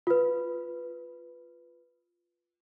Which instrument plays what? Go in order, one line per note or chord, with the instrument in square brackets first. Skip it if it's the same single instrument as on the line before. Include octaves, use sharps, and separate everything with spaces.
[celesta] F4 B4